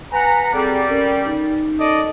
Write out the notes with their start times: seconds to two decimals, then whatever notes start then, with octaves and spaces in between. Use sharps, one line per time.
0.12 B4 F#5 G#5 A#5
0.53 G3 C4 G#4 A4 D5
0.89 C#4 A#4
1.25 D#4
1.79 A4 D5 D#5